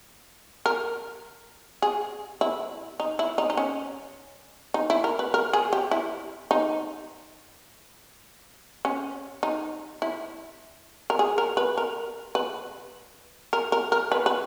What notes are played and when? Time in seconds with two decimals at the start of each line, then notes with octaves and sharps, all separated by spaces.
0.66 A#4
1.82 G#4
2.41 E4
3.00 D#4
3.19 E4
3.38 D#4
3.50 D#4
3.57 C#4
4.74 D#4
4.90 E4
5.04 A#4
5.19 B4
5.34 A#4
5.53 G#4
5.73 G4
5.91 E4
6.51 D#4
8.85 C#4
9.43 D#4
10.02 E4
11.10 A#4
11.19 G#4
11.38 A#4
11.57 B4
11.78 A#4
12.35 B4
13.53 A#4
13.72 A#4
13.92 A#4
14.12 B4
14.26 B4